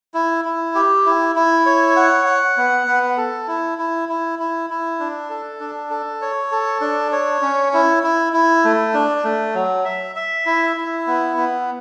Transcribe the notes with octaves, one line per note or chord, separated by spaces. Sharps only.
E4
E4
G4
E4
E4
C#5
F#5
F#5
B3
B3
A4
E4
E4
E4
E4
E4
D4
A4
D4
A4
C#5
A4
D4
C#5
C#4
E4
E4
E4
A3
D4
A3
F#3
E5
E5
E4
E4
B3
B3